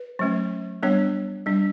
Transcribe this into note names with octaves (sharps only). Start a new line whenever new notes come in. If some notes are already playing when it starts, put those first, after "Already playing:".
Already playing: B4
F#3 A3 C#4
G3 B3 D4 C#5
G3 D4